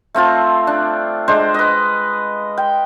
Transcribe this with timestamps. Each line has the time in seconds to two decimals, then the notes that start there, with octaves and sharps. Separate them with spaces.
0.14 A3 C4 F4 A5
0.67 D4
1.28 G#3 D4 C5
1.54 B4 D#5
2.57 G5